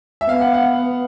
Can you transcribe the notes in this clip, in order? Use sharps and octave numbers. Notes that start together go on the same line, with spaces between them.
E5
B3 F5
F#5
F#5